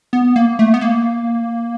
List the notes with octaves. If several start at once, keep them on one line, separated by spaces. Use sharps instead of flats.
B3
A#3
A3
B3
A#3